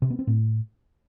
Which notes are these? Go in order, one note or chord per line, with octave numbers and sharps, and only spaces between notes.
C3
B3
C4
A2